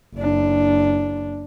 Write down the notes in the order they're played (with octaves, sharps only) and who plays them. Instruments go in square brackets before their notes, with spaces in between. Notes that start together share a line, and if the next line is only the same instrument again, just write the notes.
[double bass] F#1 D4